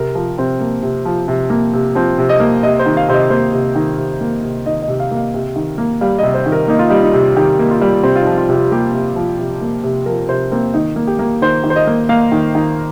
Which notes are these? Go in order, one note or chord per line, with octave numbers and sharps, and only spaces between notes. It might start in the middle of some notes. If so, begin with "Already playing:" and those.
Already playing: C3 A#4
F3 G4
C3 C4
A#3
C3
F3
C3
A#3
C3
F3 C4
C3
D#5
A#3
C3 D#5
C5
D#3
F5
C3 C5
D#5
A#3 C5
C3
D#3
C3
A#3
C3
D#3 D#5
D#5
C3
F5
A#3
F5
C3
D#3
A#3
G3 F5
C3 D#5
C5
D#3
A#4
A#3 D#4
F4
G3 D#4
D#4
C3
D#3 G4
A#3
F4
G3
C3 C4
F4
D#4
F3
F4
C3
G4
A#3 G4
C3
F3
C3
A#3
C3
F3 A#4
C3 C5
A#3 C4
D#3 D#4
A#3
G4
A#3
D#3 C5
D#3
C5
D#5
A#3
A#3 F5
D#3
D#3